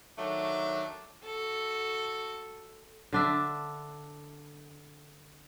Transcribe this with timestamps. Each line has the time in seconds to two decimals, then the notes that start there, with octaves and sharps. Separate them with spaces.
0.17 D#3 F#3 A3 D4
1.24 F#4 A4
3.13 D3 D4 E5